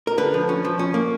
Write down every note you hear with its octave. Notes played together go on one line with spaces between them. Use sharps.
A#4
D3 B4
F3
C#4
F3
C#4
A#3